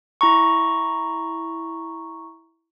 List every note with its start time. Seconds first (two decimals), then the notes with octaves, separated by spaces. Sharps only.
0.21 E4 A#5 C#6